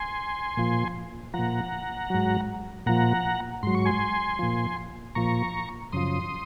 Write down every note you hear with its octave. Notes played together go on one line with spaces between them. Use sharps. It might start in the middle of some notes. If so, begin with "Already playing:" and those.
Already playing: G#5 C6
A#2 F3
A#2 F3 F#5 A#5
G#2 F#3
A#2 F3 F#5 A#5
G#2 F#3 C6
C#6
G#5 C6
A#2 F3
A#2 F3 A#5 C#6
F#2 C#3 F3 C6 D#6